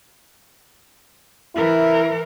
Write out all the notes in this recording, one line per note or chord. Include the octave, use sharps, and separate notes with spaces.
E3 E4 A#4